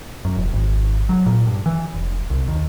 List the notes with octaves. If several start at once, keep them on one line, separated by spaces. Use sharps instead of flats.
F#2
F1
G#1
F#3
A#2
G2
E3
F1
C2
D#2